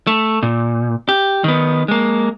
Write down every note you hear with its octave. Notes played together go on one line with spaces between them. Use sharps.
A3
A#2
G4
D#3 B3
G#3 A#3